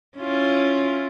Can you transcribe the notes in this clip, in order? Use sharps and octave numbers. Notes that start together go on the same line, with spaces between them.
C#4 E4 F4